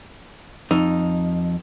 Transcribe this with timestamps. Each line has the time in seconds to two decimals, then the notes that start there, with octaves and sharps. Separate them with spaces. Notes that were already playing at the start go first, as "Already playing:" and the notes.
0.71 F2 D#4